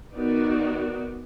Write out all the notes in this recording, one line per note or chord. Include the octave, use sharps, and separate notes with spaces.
D#3 B3 D#4 F#4 D5